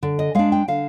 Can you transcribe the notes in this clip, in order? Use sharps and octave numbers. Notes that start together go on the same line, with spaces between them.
D3
D#5
G#3 D4 F5
G5
D3 F5